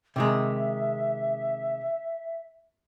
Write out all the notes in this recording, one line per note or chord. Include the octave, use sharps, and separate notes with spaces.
C3 D#3 G#3 E5